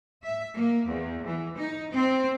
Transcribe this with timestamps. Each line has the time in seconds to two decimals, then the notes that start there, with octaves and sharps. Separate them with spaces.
0.23 E5
0.55 A#3
0.87 E2
1.25 E3
1.56 D#4
1.91 C4